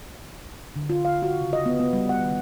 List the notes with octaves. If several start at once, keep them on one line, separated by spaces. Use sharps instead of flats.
D3
F4
F5
F#4
C#3
D#5
B3
B3
G3
F#5
D#3